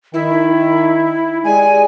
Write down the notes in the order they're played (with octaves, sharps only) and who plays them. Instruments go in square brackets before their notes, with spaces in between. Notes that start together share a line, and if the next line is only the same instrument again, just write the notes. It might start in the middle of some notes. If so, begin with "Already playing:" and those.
[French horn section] D#3 [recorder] E4
[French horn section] G#3 G4 D5 [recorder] G#5